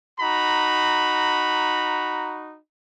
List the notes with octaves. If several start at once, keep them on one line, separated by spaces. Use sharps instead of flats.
D#4 F#4 A#5 B5